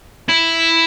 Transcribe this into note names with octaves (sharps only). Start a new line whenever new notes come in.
E4